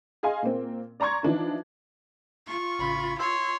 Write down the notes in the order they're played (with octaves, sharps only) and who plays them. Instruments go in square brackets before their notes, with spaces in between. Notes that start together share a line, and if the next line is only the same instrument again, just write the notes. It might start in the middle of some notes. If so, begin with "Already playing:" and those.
[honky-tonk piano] G#4 D#5 F5 G#5 C6
A#2 A#3 C4
D5 A#5 C6 C#6 G#6
E3 F3 D4 D#4
[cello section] F4 [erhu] C#6
[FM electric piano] A1 C#3 [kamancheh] B5
[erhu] C#5 [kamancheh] C6 [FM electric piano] E6